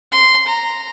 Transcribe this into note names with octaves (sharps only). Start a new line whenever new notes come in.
C6
A#5